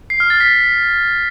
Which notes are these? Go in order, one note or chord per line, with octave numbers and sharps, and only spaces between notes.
C7
F6
A6
B6